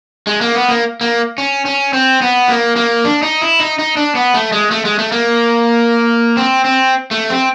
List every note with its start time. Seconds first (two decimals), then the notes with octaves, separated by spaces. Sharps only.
0.27 G#3
0.41 A#3
0.55 B3
0.68 A#3
1.01 A#3
1.38 C#4
1.65 C#4
1.93 C4
2.22 B3
2.49 A#3
2.76 A#3
3.04 D4
3.23 D#4
3.41 E4
3.60 D#4
3.79 D#4
3.97 D4
4.15 B3
4.34 A3
4.52 G#3
4.71 A3
4.85 G#3
4.99 A3
5.12 A#3
6.37 C4
6.65 C4
7.11 A3
7.30 C4